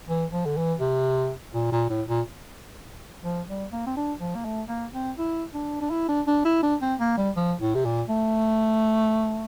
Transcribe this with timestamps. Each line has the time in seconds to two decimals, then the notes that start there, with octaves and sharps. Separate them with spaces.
0.08 E3
0.32 F3
0.46 D3
0.57 E3
0.80 C3
1.54 A#2
1.72 A#2
1.90 A2
2.08 A#2
3.24 F3
3.48 G3
3.73 A#3
3.87 C4
3.96 D4
4.20 F3
4.35 A#3
4.45 A3
4.69 A#3
4.94 C4
5.18 E4
5.54 D4
5.81 D4
5.91 E4
6.08 D4
6.27 D4
6.45 E4
6.63 D4
6.82 C4
7.00 A#3
7.17 G3
7.36 F3
7.61 A2
7.75 C3
7.85 A#2
8.09 A3